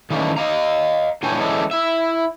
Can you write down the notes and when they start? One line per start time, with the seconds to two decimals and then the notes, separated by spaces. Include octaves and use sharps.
0.10 D#3 E3 A3 A#3 C#4 D4
0.37 D#5 F5 A#5
1.23 A#2 E3 D4 C#5 G5 G#5
1.39 E3 G#3 C#4 D4 E4 A4
1.71 E4 E5